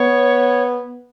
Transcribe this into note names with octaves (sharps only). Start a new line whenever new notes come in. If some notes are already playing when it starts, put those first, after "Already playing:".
Already playing: B3 C#5